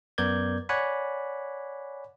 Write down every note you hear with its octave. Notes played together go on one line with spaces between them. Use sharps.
F#2 B3 A#4 D5 G6 G#6
C#5 D5 F#5 G#5 B5